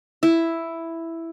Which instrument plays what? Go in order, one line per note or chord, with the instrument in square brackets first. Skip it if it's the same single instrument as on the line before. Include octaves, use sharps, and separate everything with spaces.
[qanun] E4